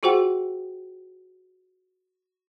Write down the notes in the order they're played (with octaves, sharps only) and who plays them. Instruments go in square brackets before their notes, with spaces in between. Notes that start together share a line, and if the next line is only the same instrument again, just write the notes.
[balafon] F4 F#4 G#4 C5 F#5 G5